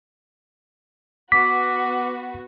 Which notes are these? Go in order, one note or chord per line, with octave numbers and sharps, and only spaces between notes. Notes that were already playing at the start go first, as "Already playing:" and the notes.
B3 F#4 D6 B6